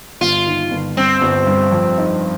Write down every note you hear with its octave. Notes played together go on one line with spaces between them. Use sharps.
G1 F4
D#3
G1
G2 C4
G1
G2
F2
D#4